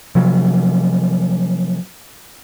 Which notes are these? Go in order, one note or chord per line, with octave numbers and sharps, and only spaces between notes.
C3 F3 F#3